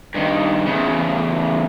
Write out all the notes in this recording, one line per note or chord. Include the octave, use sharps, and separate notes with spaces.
G2 D#3
E2 C#3